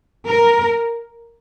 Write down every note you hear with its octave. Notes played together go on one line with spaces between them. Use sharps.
A#4